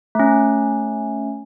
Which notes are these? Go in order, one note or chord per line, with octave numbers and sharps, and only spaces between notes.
A3 C#4